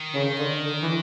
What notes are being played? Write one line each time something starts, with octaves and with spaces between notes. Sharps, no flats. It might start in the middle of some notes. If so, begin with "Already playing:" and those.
Already playing: D#3
C#3
D3
D3
E3